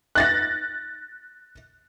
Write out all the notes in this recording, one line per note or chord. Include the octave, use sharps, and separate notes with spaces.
F#6 A6 A#6